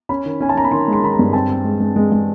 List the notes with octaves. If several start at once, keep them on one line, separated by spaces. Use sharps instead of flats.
C#4 B5
D#3
C#4 G#5
A5
C#4 A#5
B5
D#3 C6
G#3 C6
D#3 B5
A#5
G2
C4 A5
C4
G#3
G#3
G#3
G#3